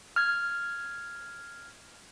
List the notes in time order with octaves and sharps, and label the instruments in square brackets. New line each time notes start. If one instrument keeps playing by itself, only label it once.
[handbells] F6 G#6